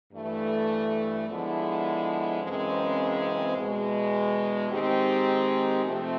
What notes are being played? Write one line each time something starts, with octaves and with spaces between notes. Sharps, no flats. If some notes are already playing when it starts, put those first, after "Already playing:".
G2 E3 A3
D3 F3 G#3 B3 E4
F#2 C#3 E3 G#3 C4
E2 B2 G#3
D#3 G#3 C4 D#4 G4
C3 F3 A3 C4 F4